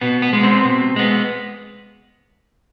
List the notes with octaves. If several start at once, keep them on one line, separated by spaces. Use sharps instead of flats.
B2 B3
B3
G#3 B3
C4
B2
G#3 B3